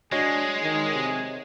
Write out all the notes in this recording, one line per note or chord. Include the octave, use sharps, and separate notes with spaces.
G#3 D4 F#4 G#4 C#5 D#5
D#3 G#4
C3